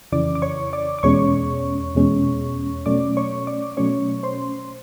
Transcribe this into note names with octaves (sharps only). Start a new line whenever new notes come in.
F2 C#3 E3 D5 D6
D6
C#5 C#6
D5 D6
D6
E2 B2 G#3 C#4 C#5 C#6
E2 B2 G#3 C#4
B2 F#3 A3 C#4 D5 D6
C#5 C#6
D5 D6
B2 F#3 A3 C#4 C#5 C#6
C5 C6